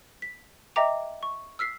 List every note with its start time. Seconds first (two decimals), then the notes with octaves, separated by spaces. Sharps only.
0.22 B6
0.76 D#5 E5 G5 A#5 D6 F7
1.23 C#6
1.59 E6 F6 B6 C7